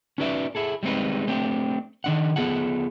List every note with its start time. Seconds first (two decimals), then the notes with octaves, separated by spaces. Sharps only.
0.18 C#4 D#4 F#4 B4 D5 E5
0.55 E4 G#4 A4
0.83 G3 G#3 C4 D#4 B4
1.27 A3 C4 D4 G4
2.04 D#3 D4 F#5
2.36 B3 F4 G#4 A4 F#5